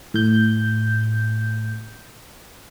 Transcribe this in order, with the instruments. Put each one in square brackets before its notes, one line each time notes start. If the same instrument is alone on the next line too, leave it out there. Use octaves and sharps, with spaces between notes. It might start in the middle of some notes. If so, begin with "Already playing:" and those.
[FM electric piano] A2 G6